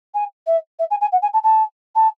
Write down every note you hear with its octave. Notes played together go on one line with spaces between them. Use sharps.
G#5
E5
E5
G#5
G#5
F#5
G#5
A5
A5
A5